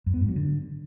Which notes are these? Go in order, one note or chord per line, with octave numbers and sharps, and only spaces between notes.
F#2
B3
G#2
F#3
D3